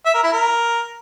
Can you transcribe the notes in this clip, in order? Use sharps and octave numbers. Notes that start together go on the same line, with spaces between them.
E5
A#4
E4
A#4